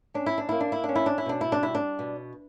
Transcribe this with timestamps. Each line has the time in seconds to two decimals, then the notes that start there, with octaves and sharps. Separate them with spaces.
0.14 C#4 D4
0.26 E4
0.38 D4
0.49 A#3 E4
0.61 D4
0.72 E4
0.84 C#4 D4
0.96 E4
1.06 D4
1.18 E4
1.26 B2 D4
1.41 E4
1.52 D4
1.62 G3 E4
1.75 D4
1.99 B2